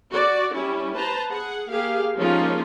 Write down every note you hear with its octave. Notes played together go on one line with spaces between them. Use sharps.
F#4 D5
G3 C#4 E4
B4 C5 A5 A#5
G#4 F#5
A#3 G4 G#4 F5
F3 G#3 A#3 C#4 D#4 F4